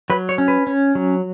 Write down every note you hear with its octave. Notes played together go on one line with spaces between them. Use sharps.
F#3 B4
C#5
C#4
B4
C#4
F#3